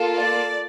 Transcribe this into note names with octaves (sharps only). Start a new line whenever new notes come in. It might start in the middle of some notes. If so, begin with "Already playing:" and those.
Already playing: A#3 F4 A4
D5